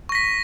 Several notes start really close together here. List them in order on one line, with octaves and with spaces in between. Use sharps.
C#6 A#6 B6